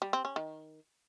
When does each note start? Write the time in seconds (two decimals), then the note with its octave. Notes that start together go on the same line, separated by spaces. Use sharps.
0.02 G3
0.13 C4
0.25 C#4
0.36 D#3